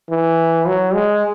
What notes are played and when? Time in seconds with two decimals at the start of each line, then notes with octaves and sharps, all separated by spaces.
0.10 E3
0.67 F#3
0.94 G#3